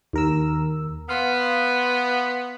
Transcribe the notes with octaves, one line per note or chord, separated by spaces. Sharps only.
D#2 A#4 E6
B3 F5 C6